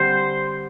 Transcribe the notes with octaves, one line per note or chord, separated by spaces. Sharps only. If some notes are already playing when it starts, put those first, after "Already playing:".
Already playing: D3 G3 C4 C5